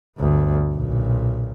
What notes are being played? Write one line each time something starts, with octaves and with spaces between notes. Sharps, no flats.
G1 D2
B1 A#2